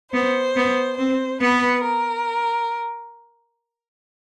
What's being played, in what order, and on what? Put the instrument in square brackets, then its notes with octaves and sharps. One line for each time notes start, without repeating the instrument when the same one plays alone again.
[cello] B3 [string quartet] C5
[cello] B3
[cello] C4 [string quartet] C5
[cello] B3 [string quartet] B4
[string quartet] A#4